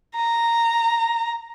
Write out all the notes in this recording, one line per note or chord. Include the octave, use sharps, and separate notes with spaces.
A#5